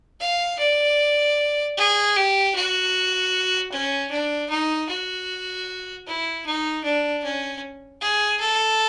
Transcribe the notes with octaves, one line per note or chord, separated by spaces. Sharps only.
F5
D5
G#4
G4
F#4
C#4
D4
D#4
F#4
E4
D#4
D4
C#4
G#4
A4